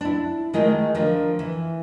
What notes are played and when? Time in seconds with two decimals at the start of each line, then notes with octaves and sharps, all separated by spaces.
0.01 D4 E4
0.53 D#3 G#3 A3 G#4 A#4 D#5
0.95 D3 F3 A#4
1.39 E3